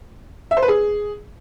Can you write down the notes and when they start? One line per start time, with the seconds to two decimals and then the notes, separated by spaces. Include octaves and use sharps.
0.51 E5
0.57 C5
0.62 B4
0.68 G#4